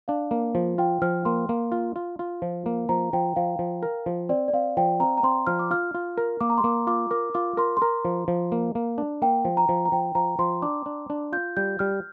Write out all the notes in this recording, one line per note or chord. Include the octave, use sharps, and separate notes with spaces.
D4 F5
A#3
F3
F4 G5
F3 F6
A#3 C6
A#3
F4
F4
F4
F3
A#3
F3 A#5
F3 G5
F3 F5
F3
A#4
F3
C4 D5
D5
C4 F5
F3 G5
C4 A#5
A#5
C4 C6
F3 F6
D6
F4 F6
F4
A#4
A#3 D6
A#5
C6
A#3 D6
F4 D6
A#4 D6
F4 D6
A#4 C6
C6
A#4 A#5
F3
F3
A#3
A#3
D4
A#3 G5
F3
A#5
F3
A#5
F3 G5
F3 A#5
F3 C6
D4 D6
D4
D4
F4 G6
G3 G6
G3 F6